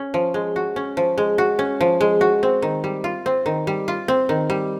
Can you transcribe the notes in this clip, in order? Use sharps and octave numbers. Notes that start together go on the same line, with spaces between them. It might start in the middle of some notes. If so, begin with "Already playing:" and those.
Already playing: C#4
F3
G#3
F#4
C#4
F3
G#3
F#4
C#4
F3
G#3
F#4
C4
D#3
G3
F4
C4
D#3
G3
F4
C4
D#3
G3